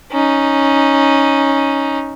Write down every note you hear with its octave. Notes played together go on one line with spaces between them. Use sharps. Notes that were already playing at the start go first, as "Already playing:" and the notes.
C#4 D#4